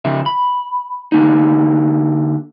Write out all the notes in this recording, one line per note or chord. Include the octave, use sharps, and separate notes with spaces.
C#3 F3 E5
B5
D3 A#3 D#4